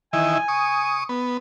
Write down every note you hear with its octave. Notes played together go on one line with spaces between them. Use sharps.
D#3 E3 E4 G#5
C#6 D#6
B3